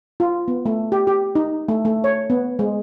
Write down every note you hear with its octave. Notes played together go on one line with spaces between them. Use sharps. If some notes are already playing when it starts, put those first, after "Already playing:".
F4
B3
A3
G4
G4
D#4
A3
A3
C#5
B3
G#3